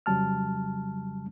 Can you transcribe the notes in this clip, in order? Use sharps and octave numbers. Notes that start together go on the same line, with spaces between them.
F2 C#3 F#3 G3 A5 F6